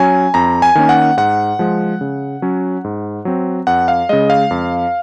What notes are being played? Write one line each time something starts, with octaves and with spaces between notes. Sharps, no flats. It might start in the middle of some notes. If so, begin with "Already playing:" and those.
Already playing: F#3 C#4 G#5
F2 A#5
G#5
D#3 A#3 C#4
F#5
G#2 F#5
F3 G#3
C#3
F#3 C#4
G#2
F#3 C4
F2 F#5
F5
C#3 G#3 D#5
F5
F2